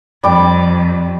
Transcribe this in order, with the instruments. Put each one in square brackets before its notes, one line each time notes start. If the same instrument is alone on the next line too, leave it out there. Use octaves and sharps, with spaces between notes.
[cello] F2 [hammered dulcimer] G3 D6